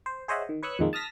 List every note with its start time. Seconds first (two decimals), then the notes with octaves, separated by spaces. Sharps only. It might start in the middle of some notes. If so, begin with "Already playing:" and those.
0.06 C5
0.28 G#4 C5 C#5 D#5 E5 F#5
0.49 D#3
0.63 B4 C#5 C#6 D#6 E6 F#6
0.79 F2 A#2 D#3 G#3 A#3
0.93 A5 D#6 F6 A#6 B6